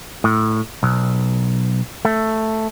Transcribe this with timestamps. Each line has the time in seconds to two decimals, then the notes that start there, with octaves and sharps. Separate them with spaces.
0.24 A2
0.83 B1
2.05 A3